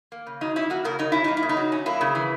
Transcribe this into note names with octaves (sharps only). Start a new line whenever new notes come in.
A#3
C#3
F#3 D#4
C#4 E4
A#3 F#4
C#3 A#4
F#3 D#4
C#4 E4
A#3 D#4
E4
C#3
D#4
F#3
C#4
A#3 E4
C#3
E3